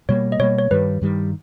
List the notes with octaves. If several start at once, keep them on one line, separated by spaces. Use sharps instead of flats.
B2 G3 A#3 C#5
D#5
B2 G3 A#3 C#5
C#5
G2 D#3 G3 B4
G2 D#3 G3